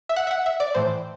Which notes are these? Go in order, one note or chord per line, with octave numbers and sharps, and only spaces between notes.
E5
F#5
E5
F#5
E5
D5
A2 E3 C5